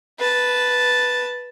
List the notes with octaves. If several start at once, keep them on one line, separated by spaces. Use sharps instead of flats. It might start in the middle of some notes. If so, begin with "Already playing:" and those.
B4 A5